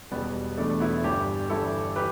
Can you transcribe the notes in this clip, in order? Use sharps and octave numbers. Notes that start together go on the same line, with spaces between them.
E1 E2 B2 G3 B3
E1 E2 B2 A3 D4
B3 E4
G1 G2 E3 D4 G4
G1 G2 E3 E4 A4
E3 G4 B4